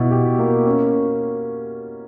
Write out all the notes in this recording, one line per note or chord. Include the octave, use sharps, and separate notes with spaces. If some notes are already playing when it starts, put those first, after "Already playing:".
Already playing: B2 E4
G4
A#3
C#4